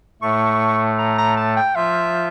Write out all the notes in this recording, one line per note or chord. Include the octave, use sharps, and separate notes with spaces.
A2 A3 C#6
A#5
A#5
A5
G5
F3 F4 E5